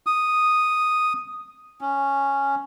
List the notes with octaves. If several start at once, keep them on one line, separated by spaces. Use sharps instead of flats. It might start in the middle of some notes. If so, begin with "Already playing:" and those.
D#6
C#4